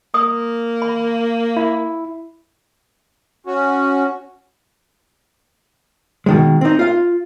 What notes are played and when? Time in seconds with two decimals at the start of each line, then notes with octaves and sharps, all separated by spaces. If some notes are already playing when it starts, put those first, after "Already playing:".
0.14 A#3 D#6
0.82 B5
1.57 E4
3.46 C#4 F#4
6.26 B2 D#3 G#3
6.61 C4 D#4
6.79 F4 F5